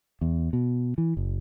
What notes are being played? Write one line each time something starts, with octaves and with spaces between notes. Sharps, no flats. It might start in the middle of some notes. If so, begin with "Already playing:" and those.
E2
B2
E3
F#1